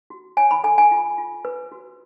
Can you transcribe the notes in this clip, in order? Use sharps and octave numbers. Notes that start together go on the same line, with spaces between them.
F#4
C#5 G#5
B5
A4 G#5
G#5
F4
F4
B4
F#4